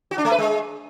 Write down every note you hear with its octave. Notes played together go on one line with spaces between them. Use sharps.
F#4
D4
A3
B4
G#3